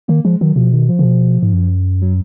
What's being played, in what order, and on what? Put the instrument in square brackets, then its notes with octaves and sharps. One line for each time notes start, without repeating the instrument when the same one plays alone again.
[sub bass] D#3 [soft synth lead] A#3
[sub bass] F3 [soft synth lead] G#3
[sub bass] D#3 [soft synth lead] F#3
[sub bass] B2 [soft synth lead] F3
[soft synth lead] D#3
F3
[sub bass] C#3
B2
G#2
F#2
[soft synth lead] F#3